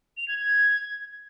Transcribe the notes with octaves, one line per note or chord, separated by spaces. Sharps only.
F7
G#6
G#6